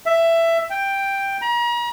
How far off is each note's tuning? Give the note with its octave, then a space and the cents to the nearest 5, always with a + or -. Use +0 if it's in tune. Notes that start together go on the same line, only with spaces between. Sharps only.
E5 +15
G5 +5
A#5 +40